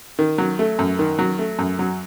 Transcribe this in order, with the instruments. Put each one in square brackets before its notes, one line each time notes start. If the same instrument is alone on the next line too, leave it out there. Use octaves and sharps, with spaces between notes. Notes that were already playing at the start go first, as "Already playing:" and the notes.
[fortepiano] D#3
F#3
A3
F#2
D#3
F#3
A3
F#2
F#3